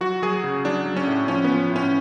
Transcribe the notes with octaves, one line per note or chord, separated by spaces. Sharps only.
F#3 F#4
F#3 G#4
C#3
F#3 D4
F#3
C#4
A2
F3 C#4
B3
F3
A2
C#4